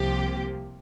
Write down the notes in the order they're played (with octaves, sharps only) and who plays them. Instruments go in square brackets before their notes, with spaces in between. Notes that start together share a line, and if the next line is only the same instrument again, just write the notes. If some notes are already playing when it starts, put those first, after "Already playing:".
Already playing: [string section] C2 C3 F3 A#3 G4